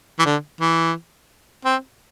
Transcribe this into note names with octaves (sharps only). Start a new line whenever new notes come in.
E3
D3
E3
C4